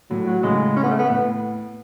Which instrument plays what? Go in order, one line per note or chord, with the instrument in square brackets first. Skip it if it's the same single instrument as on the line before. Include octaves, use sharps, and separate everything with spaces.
[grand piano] A2 [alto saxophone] F#3
[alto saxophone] F#3
[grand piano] A2 C#3 [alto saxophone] G#3
[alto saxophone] C#4
B3
A3
B3
[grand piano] A2 [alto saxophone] B3